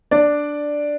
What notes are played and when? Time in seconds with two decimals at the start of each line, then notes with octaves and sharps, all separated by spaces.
0.11 D4 D5